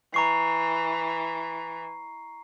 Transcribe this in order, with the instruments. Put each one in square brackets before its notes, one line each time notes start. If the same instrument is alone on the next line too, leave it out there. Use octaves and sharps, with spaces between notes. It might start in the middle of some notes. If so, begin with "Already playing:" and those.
[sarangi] E3 [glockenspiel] A#5 C#6 C7